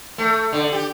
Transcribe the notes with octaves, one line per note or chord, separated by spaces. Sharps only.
A3
D3
G4